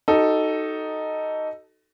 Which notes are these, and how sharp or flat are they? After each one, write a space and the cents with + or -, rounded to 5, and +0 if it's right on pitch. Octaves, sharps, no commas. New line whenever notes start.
D#4 +0 F#4 +40 A4 +0